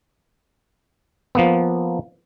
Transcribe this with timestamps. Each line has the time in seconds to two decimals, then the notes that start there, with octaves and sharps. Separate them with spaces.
1.35 F3 A#3 B3